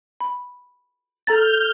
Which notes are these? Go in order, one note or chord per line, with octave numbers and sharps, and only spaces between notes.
B5
A4 A#5 F6 G6 A6